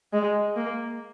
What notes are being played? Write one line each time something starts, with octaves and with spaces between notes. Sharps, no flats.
G#3
A#3